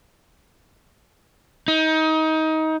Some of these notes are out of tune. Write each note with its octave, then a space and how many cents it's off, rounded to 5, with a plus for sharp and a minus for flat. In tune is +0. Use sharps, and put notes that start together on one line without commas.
D#4 +25